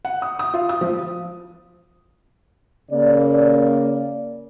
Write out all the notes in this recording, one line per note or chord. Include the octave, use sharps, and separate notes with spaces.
F#5
D#6
D#6
F4
D#6
F3
C#3 A#3 D5